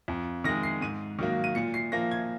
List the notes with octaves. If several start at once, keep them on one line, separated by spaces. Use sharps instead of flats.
F2
D#3 G#3 A#6
C7
G#2 D#7
D#3 F#3 A#3
D#7
A#2 C#7
C7
F3 A#3 A#6
G#6